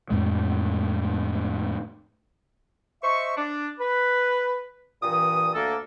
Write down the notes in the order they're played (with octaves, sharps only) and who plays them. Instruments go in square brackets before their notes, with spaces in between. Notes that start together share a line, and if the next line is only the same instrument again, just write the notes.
[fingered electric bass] F2 A2 G#3
[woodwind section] C5 D#5 E5 C#6
D4
B4
G2 A#2 E3 D#6
D2 A#3 A4